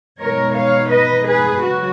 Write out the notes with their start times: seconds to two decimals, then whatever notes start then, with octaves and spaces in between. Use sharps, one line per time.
0.19 B2 G#3 D#4 A#4 C#5
0.55 C#5 F5
0.90 B4 D#5
1.26 G#4 B4
1.62 C#3 F#3 F#4